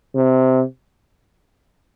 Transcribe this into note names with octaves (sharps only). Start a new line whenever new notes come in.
C3